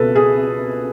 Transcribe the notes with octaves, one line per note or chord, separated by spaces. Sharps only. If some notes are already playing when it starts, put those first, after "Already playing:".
Already playing: C#2 B2 A4 B4
G#4